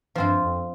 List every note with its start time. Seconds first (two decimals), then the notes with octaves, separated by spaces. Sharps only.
0.15 G2 F3 C4 F4
0.42 F2